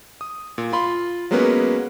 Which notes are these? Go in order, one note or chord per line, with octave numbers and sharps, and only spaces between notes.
D#6
A#2
F4 B5 C6
F#3 G#3 A#3 B3 C#4 B4